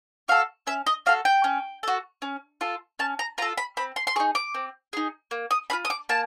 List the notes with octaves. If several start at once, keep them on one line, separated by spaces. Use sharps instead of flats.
F#4 A4 F5
C#4 E5
D#5
F#4 A4 F5
G5
C#4
F#4 A4
C#4
F4 A4
C#4 A5
A#5
F4 A4 A#5
B5
C4 B5
C6
C6
D#4 G#4 C#6
D6
C4
D#4 G#4
A#3
D#6
C#4 F4 B5
D#6
D6
A#3 A5